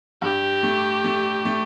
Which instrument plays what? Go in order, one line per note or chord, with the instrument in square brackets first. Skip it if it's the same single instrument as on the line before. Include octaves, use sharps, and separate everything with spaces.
[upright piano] G2 [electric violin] G4
[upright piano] A3
A3
A3